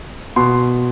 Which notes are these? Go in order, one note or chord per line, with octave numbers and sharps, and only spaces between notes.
B2 C6